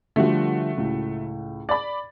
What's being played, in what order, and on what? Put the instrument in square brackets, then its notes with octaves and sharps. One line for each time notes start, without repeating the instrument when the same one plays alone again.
[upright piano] D3 F3 G3 [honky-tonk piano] A3 F#4
[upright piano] C#2 A2
[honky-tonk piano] D5 B5 [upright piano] A6